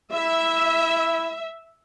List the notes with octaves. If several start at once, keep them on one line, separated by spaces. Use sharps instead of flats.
E4 E5